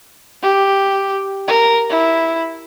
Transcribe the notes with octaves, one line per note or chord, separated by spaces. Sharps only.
G4
A#4
E4